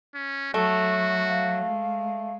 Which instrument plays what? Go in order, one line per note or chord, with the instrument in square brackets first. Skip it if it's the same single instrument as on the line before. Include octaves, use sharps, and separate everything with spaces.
[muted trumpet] C#4
[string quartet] F#3 [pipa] A3 [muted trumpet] F#4
[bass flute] F5
[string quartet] G#3